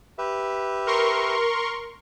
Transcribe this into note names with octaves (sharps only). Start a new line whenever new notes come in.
G4 B4 E5
A#4 C6 C#6